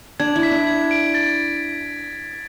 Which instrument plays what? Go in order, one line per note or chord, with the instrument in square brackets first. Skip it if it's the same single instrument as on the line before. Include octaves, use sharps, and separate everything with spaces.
[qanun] D4 [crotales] G#6
[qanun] E4
[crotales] B6
[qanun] D4
[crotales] G#6
D7
A6